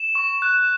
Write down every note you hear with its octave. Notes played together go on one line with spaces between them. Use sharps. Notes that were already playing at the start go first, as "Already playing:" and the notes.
Already playing: E7
C#6
F#6